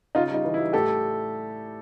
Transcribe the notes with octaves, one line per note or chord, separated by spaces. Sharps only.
C#3 D#4 F4
G3 D#4
E3
E4
G3
A2 G4 A4